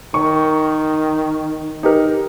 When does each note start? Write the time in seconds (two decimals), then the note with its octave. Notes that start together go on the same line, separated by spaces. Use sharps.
0.14 D#3 C#6
1.83 D#4 G4 A#4